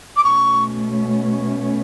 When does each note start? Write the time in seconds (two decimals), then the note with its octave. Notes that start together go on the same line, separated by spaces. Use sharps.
0.16 D6
0.24 B2 A3 C#4 C#6